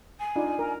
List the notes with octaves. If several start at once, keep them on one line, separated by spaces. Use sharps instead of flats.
G#5
D4 D#4 F4
A#4